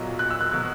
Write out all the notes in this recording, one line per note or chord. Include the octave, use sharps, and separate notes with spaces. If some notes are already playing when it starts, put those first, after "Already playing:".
Already playing: B1 A#2 F#3
F#6
E6
F#6
B2 F#3 F#6